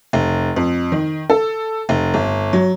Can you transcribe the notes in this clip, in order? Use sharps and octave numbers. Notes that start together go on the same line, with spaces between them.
F1
F2
D#3
A4
F1
G1
F#3